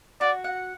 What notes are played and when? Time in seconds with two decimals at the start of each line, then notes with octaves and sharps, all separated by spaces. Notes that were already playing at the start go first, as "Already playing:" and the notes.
0.21 F#4 D5
0.44 F#5